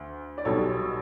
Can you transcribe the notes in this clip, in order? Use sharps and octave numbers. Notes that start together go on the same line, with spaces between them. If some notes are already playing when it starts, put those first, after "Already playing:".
Already playing: D2 D3
D5
B1 B2 G3 A4 C#5